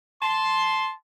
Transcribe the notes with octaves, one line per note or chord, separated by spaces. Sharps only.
A5 C6